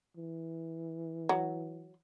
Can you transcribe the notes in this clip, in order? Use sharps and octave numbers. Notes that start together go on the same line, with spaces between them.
E3
F#3